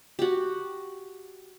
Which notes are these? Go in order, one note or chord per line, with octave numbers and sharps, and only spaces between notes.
F#4 G4